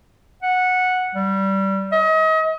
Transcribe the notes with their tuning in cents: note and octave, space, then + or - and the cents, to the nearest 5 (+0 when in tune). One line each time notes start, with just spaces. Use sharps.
F#5 -10
G3 -15
D#5 +35